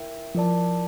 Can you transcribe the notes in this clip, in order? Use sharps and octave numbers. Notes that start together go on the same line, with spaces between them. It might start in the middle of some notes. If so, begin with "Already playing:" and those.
Already playing: E4 A#4 E5 G5
F3 E4 A#4 D5 A5